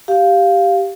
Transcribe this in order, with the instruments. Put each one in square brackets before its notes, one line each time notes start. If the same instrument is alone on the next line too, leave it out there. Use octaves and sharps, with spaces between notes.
[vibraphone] G4 F5